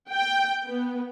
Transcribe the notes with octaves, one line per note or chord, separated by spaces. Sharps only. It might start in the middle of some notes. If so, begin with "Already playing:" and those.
G5
B3